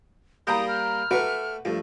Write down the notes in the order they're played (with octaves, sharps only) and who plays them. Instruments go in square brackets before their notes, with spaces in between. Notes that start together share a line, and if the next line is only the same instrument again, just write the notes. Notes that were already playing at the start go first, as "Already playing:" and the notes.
[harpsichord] G3 A#3 G4 [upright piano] A#5 B5 G6 [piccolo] D#6
[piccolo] F6
[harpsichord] A3 C#6 D6 [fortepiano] F#4 B4
[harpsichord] G2 [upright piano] F3 A3